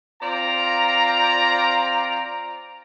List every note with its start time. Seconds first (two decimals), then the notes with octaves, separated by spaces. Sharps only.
0.22 C4 F4 D5 A#5